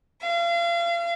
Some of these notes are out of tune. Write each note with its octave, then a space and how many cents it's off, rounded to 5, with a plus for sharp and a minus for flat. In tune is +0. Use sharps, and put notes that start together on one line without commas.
F5 -35